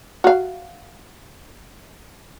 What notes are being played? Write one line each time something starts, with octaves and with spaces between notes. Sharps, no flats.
F#4 F5